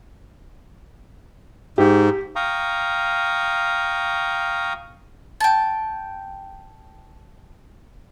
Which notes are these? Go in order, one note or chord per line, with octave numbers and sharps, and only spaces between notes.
G#2 G4
F5 G5 A#5 C#6 D#6
G5 A5